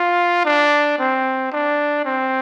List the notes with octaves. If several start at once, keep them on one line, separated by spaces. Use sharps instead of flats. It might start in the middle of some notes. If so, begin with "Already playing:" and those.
Already playing: F4
D4
C4
D4
C4